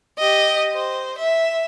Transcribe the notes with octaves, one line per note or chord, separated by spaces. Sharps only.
G4 D#5
C5
E5